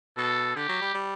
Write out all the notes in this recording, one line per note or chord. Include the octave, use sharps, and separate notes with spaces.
B2 A4
D3 G4
F#3
G3
G3